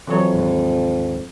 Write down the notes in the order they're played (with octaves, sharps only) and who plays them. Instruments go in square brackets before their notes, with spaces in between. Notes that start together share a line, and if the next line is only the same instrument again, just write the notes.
[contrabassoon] F2 [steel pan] E3 F#3 C#5
[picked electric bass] D#2 G#2